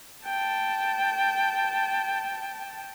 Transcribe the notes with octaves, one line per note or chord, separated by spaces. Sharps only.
G5 A5